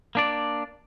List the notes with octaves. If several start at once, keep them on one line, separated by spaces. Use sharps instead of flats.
A#3 D4 D5